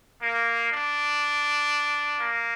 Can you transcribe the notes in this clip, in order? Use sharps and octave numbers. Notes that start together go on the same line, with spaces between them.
A#3
D4
A#3